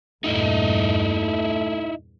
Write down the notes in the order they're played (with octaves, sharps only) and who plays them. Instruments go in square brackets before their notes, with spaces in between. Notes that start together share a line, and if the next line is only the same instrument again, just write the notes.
[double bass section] E2 G2 A#2 [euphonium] A3 [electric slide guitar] D#4 E4 D#5